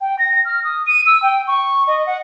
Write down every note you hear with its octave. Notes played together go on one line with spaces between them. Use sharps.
G5
A#6
F6
D#6
D#7
E6
G5
C#6
D#5
F#5